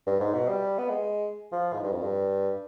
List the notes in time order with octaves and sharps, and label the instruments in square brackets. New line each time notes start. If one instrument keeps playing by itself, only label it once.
[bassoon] G2
G#2
B2
G3
B3
G#3
F3
G#2
G2
F2
G2